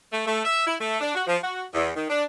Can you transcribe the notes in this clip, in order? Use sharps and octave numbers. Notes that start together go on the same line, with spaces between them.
A3
A3
E5
E4
A3
D4
F#4
F3
F#4
E2
D#3
D4